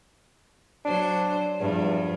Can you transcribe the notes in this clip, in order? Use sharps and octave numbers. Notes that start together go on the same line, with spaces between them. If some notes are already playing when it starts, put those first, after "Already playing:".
F#3 D4 C5
E2 G2 F3